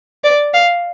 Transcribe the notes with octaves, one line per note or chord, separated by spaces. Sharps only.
D5
F5